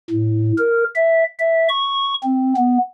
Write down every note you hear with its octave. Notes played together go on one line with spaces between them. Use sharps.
A2
A#4
E5
E5
C#6
C4
B3